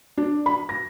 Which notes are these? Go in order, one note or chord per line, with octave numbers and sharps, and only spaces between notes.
D4
B5
A#6